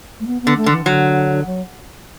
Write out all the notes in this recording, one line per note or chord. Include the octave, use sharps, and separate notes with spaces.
A3
B3
B3
D3
A3
D3
E3
D3 F#3
F#3